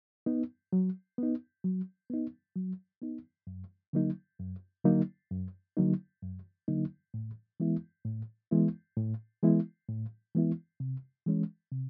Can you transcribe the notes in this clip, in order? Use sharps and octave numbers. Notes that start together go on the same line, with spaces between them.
B3 D#4
F#3
B3 D#4
F#3
B3 D#4
F#3
B3 D#4
F#2
D3 F#3 A#3 D#4
F#2
D3 F#3 A#3 D#4
F#2
D3 F#3 A#3 D#4
F#2
D3 F#3 A#3 D#4
A2
E3 G#3 B3 E4
A2
E3 G#3 B3 E4
A2
E3 G#3 B3 E4
A2
E3 G#3 B3 E4
C3
E3 G#3 C#4
C3